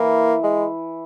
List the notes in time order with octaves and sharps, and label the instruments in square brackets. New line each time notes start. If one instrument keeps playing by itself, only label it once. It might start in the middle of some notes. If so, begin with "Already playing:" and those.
Already playing: [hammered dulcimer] E3 [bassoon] A#3
[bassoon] G#3